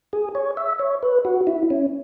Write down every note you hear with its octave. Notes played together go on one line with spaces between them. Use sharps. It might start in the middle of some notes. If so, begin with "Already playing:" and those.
G#4
C#5
E5
C#5
B4
F#4
E4
C#4